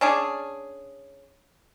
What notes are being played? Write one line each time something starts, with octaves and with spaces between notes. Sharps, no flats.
C#4 D4 G#4